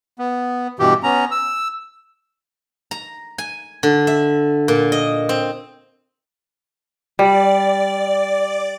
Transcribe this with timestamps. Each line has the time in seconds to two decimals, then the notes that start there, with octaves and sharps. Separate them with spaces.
0.19 B3
0.79 G2 B2 E3 G4
1.03 B3 C#4 A#5
1.31 E6
2.91 A#5
3.38 G#5
3.83 D3
4.07 E5
4.68 A#2
4.92 D#5
5.29 C4
7.19 G3 D5